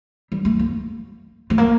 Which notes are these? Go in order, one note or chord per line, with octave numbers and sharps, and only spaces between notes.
G3
A3
A#3
A3
A#3